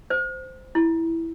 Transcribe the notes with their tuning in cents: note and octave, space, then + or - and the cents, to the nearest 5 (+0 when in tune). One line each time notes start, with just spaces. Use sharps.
C5 -10
E4 +0